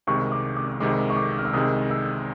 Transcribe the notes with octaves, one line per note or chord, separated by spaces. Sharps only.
C2 C3 D#3 G#3 C#6
D6
D6
C2 C3 D#3 G#3 D6
C#6
D6
F6
E6
C2 C3 D#3 G#3 D#6
E6